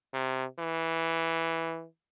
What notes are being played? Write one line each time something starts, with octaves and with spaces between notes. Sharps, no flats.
C3
E3